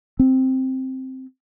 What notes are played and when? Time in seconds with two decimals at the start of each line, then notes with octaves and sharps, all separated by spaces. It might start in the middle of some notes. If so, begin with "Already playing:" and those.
0.19 C4